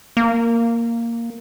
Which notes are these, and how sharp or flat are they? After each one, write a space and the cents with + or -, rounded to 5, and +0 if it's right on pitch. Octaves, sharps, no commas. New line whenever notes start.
A#3 -5